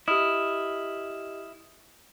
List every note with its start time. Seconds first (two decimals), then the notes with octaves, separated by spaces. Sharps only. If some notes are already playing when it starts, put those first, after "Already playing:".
0.08 E4 G4 D#5 D#6 F6